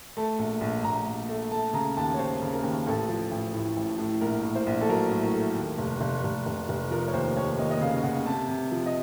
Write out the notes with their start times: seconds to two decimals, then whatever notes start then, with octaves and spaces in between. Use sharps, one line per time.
0.17 A3 A5
0.39 A#1
0.61 A#1
0.84 A#1 A#5
1.06 A#1
1.29 A3
1.51 A3 A5
1.74 C#3 A#5
1.97 D#2 A5
2.14 C#5
2.19 D#2 C5
2.42 C#3
2.53 A#4
2.63 D#2
2.87 A1 A4
3.09 F3
3.31 A1
3.54 A2
3.77 A1
3.98 A2
4.21 A#1 A#4
4.45 A2
4.56 C5
4.67 A#1
4.81 A4
4.89 F#3 A#4
5.11 A2
5.23 A#4
5.34 A3
5.56 D#2
5.78 F1
6.01 F1
6.24 F1
6.46 F1
6.69 F1
6.91 F3 A#4
7.08 C#5
7.13 D#2 C5
7.36 D#2 C#5
7.58 D#2 D#5
7.71 D#5
7.81 C#3 F5
8.03 C#3 F#5
8.26 C3 A5
8.48 C3
8.72 F3
8.86 D#5